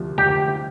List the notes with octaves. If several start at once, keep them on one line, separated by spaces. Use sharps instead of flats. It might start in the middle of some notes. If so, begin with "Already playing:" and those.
Already playing: D2 C3 F3
D2 G4